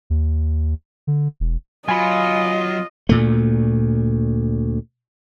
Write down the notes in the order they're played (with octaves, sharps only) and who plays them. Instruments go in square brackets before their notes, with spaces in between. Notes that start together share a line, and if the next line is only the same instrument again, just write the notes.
[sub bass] D#2
D3
E1
[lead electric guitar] F#3 [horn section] F4 [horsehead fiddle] D#5 [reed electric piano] G#5 B5
[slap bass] D2 A#2 A3